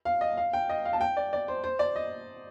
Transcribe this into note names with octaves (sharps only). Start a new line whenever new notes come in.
F5
D#5
F5
G5
D#5
F5
A5
G5
D5
D5
C5
C5
D5
D#5